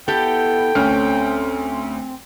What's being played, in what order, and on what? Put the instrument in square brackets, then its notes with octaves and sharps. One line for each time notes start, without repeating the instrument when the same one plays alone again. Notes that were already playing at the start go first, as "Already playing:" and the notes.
[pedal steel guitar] B3 E4 [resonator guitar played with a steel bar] G4 A4 [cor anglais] G5
[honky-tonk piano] D2 C#4 F6 [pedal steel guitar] C4